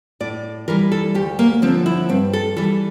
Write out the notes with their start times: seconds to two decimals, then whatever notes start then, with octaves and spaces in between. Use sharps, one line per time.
0.20 A2 D5
0.68 E3 G3 A#4
0.92 A4
1.15 D2 G4
1.39 A#3
1.62 D3 F3 C4
1.86 E4
2.09 G2 C4
2.33 A4
2.56 E3 G3 A4